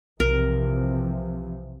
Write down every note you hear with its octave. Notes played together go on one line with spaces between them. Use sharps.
B1 C3 E3 F3 A#4